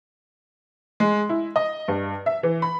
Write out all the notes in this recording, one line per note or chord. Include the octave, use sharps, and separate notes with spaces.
G#3
E4
D#5
G2
E5
E3
B5